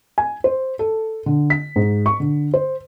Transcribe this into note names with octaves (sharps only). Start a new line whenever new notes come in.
G#5
C5
A4
D3
B6
G#2
C#6
D3
C5